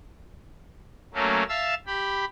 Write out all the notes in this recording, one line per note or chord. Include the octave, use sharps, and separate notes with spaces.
F#3 A3 A#3 C#4
E5 F5 A5 E6
G4 B5